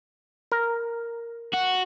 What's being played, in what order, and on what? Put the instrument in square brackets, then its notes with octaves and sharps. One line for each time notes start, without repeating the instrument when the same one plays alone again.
[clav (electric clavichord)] A#4
[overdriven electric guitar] F#4